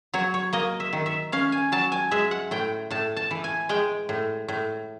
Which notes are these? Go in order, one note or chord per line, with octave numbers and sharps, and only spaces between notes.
F#3 C#5
C#5
A#3 D#5
E5
D#3
E5
C#4 F5
G#5
F#3 A5
G#5
G#3 E5
F#5
A2 G5
A2 A5
A5
E3
G#5
G#3 G5
A2
A2